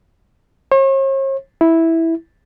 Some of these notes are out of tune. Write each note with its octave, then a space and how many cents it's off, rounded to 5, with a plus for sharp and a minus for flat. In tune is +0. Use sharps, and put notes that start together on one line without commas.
C#5 -45
E4 -5